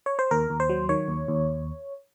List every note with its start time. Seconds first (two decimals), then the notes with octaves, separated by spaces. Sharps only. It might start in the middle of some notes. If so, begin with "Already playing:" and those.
0.06 C#5
0.19 C5
0.31 D#2 A#4
0.50 D#2
0.60 C5
0.69 F#3
0.89 D#3 C#5
1.08 D#2
1.28 D#2